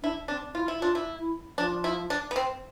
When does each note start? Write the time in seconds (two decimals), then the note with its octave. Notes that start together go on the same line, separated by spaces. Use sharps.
0.02 D4 E4
0.28 C4 D4
0.54 E4 F4
0.68 E4
0.80 D4 F4
0.95 E4
1.20 E4
1.58 F3 D4
1.84 E4
2.10 D4
2.31 B3
2.36 C4